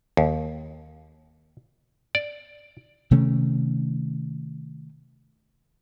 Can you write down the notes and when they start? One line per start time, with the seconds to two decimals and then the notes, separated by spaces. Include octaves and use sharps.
0.17 D#2
2.15 D5
3.11 C3 D#3 A3 C#4